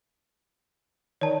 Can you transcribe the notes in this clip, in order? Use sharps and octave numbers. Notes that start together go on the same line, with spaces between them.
D#3 C#5 D5 A5